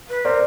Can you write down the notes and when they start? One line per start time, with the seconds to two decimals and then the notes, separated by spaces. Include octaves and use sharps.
0.10 B4
0.25 A#4 C5 D5